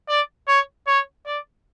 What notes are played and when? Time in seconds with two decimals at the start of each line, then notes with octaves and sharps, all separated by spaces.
0.09 D5
0.48 C#5
0.87 C#5
1.26 D5